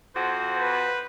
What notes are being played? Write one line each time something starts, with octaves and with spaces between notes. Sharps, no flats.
F2 F#4 C5
B4